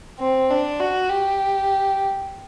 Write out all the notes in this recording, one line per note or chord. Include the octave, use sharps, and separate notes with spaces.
C4
D4
F#4
G4